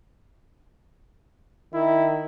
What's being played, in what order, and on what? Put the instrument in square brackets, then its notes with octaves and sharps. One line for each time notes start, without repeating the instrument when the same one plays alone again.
[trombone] D#3 [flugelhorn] E4